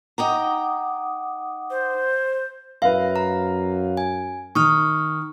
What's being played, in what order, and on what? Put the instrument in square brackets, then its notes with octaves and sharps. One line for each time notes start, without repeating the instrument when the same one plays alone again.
[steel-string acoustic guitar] D#4 G5 A#5 [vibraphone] F#5 D6 D#6
[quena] C5
[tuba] F#2 [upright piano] B4 F5 [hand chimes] E5
[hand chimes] A#5
G#5
[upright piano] D#3 [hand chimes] C#6 D#6 F6